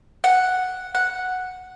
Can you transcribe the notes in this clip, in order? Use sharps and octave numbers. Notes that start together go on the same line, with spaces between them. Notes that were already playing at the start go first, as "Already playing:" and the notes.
F#5
F#5